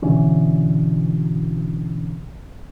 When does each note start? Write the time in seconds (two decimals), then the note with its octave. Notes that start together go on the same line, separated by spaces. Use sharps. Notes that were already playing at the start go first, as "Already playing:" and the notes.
0.02 B2 D3 E3 C#4